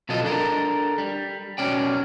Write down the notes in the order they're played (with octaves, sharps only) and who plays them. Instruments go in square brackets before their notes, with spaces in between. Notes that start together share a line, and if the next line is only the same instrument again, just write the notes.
[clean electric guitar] B2 F#3 F4 A4 D#5
D4 A4 A#4
G3
B1 F3 F#3 C#4 D5 G5